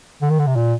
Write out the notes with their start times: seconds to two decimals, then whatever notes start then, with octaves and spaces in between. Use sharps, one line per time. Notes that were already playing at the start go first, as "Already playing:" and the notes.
0.22 D3
0.30 D#3
0.39 D3
0.47 C3
0.56 A#2